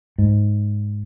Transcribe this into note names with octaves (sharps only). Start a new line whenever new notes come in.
G#2